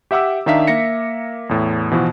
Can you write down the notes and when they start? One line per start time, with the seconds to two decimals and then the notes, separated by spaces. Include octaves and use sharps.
0.11 G4 E5 F#5 D6 E6
0.46 D#3 D4 D#4 E5 F5 B6
0.67 A#3 E5 A#6 C#7
1.49 E2 A2
1.91 B2 E3 F3 E4 F#4